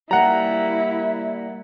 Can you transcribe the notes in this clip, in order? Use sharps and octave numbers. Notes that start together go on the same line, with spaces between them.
G3 A#3 E4 F#5 A#5